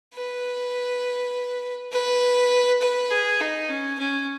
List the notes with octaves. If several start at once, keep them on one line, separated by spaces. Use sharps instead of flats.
B4
B4
B4
G#4
D#4
C#4
C#4